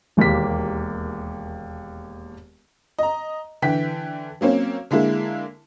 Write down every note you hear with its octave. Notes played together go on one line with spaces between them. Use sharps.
E1 D#2 A#3 G4 B6
D#5 A#5
D3 E3 G5 B6
F#3 A#3 C4 C#4
D3 G#3 A#3 E4